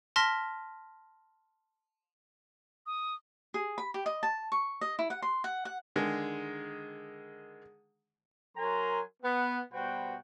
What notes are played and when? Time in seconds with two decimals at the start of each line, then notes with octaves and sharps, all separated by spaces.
0.16 A5 C6 F6 A#6 B6
2.86 D#6
3.54 G#4
3.78 B5
3.94 G4
4.06 D#5
4.23 A5
4.52 C#6
4.81 D#5
4.99 E4
5.10 F#5
5.22 C6
5.44 F#5
5.65 F#5
5.96 D3 D#3 G#3
8.57 F#3 A#4 G#5 A#5 C6
9.23 B3 F#5
9.72 B2 G3 F#4 B4 C5 G5